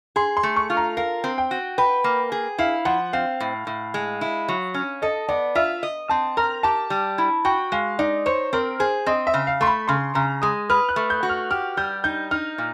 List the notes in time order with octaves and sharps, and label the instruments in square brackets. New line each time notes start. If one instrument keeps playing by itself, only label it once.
[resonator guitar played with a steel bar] G#4 [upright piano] C6
[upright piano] C6
[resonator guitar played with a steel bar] A3
[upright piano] C#6
[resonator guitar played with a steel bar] F4
[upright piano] A#5
[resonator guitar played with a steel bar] A#4 [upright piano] F5
[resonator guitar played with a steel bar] C4
[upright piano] G5
[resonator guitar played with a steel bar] F#4
[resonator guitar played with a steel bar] B4 [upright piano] G5
[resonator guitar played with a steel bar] A#3
G#4
[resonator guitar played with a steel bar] E4 [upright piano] F5
[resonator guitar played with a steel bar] F3 [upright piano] F#5
[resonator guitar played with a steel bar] C4 [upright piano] F5
[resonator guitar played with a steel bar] A2
A2
G#3
E4
F#3
C#4
[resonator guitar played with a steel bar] A4 [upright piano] D#5
[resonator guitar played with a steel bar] B3 [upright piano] D5
[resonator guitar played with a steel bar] F4 [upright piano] E5
[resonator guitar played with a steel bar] D#5
[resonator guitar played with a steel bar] C4 [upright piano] A5
[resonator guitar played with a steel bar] A#4 [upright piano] A#5
[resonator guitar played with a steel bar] G4 [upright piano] A5
[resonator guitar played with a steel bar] G3
E4
[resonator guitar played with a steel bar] F#4 [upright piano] G5
[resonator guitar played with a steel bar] G#3 [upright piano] F5
[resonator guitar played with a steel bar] D#4 [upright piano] D5
[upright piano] C5 [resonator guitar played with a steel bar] C#5
[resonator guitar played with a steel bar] C4 [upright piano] A#4
[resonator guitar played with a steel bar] G#4 [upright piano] C5
[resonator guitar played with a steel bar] C4 [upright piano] D#5
[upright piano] E5
[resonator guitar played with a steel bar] C#3
[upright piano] F5
[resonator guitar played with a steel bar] A3 [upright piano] C6
[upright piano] B5
[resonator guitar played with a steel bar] C#3 [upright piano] C6
[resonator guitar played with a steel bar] C#3 [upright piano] A#5
[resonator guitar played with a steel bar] G#3 [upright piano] D#6
[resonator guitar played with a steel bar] B4 [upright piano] F6
[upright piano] F#6
[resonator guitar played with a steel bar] A3
[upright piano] G6
[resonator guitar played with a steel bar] F#4
[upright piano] F6
[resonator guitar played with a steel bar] G4 [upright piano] F6
[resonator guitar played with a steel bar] G3 [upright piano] G6
[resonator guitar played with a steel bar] D#4 [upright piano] G6
[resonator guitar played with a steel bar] D#4 [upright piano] F6
[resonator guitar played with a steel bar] A#2